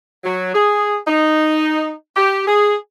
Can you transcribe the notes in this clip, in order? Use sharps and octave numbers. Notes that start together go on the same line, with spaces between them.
F#3
G#4
D#4
G4
G#4